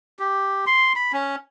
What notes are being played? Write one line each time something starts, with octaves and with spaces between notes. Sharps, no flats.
G4
C6
B5
C#4